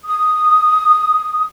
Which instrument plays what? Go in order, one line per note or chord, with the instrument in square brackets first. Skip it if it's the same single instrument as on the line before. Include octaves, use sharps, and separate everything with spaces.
[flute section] D#6